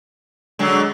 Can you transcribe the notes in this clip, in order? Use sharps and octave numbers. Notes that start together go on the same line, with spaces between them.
D3 F#3 G#3